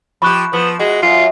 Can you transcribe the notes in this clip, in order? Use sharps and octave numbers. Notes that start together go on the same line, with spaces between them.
F3 G4 B5 C#6 F#6
F3 B3
G#3 F#4
F#2 F4